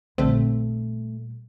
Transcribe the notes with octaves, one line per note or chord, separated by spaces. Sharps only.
A#1 A#2 D3 G3 A3 C4